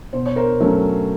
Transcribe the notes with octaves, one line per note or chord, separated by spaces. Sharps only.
B2 C5
C#5
A#4 C5
F#3 A3 C#4